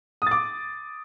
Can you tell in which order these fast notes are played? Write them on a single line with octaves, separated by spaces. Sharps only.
D#6 A6 D6